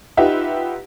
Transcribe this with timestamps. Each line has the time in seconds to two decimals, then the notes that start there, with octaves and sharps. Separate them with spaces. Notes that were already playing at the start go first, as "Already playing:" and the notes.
0.17 D#4 F4 G4 B4 E5 F#5